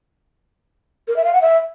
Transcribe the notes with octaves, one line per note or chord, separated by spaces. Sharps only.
A#4
E5
F5
F#5
E5